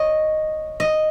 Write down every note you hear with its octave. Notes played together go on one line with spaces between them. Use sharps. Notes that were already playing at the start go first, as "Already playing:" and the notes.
Already playing: C#5 D#5
D#5